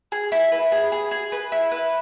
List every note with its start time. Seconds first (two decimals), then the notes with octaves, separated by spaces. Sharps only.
0.12 G#4
0.32 E4
0.52 B4
0.72 G#4
0.92 G#4
1.11 G#4
1.32 B4
1.52 E4
1.71 B4